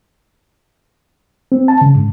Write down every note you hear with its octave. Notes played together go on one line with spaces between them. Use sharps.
C4
A5
C#3
G#2